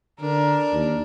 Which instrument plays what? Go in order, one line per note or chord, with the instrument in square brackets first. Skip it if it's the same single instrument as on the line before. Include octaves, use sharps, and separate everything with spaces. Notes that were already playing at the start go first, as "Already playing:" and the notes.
[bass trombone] D3 [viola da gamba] D4 [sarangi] A#4
[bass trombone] D#2